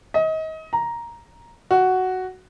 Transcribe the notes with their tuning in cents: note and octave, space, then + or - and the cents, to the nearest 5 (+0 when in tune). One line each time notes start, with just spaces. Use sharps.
D#5 +30
A#5 +5
F#4 +5